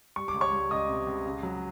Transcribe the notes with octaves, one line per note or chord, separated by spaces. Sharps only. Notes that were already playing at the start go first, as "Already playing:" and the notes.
G3 C#6
D6
C#2
C#5 C#6
G3
C#2 D#5 D#6
C3
C#2
C#3
F#3